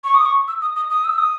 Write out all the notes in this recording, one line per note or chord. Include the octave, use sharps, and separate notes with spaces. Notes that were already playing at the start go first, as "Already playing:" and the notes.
C#6
D#6
C#6
E6
D#6
D#6
D#6
E6
D#6